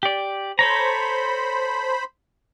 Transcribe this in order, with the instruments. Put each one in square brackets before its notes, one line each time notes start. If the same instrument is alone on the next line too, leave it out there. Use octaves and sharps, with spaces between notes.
[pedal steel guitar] G4 D5
[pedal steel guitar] A4 C#5 A#5 [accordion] C5 B5